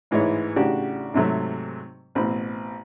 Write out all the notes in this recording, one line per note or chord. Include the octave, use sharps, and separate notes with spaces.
A1 G#2 E3 G#3 E4 C#5
A1 C#3 D4 F#4 G4
G#2 C3 F#3 A3
A1 B2 C4 C5 B5